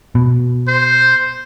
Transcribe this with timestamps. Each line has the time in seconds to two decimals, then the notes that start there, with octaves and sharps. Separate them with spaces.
0.15 B2
0.68 C5